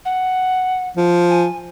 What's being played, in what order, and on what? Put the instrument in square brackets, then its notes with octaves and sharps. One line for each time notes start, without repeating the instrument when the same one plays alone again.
[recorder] F#5
[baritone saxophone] F3
[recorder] G#5